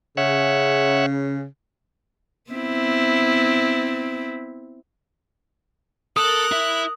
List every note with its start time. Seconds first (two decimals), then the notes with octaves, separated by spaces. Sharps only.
0.17 C#3 C#5 E5 F#5
2.51 B3 C4 E4
6.16 A4 A#4 D#6 F#6
6.52 E4 E5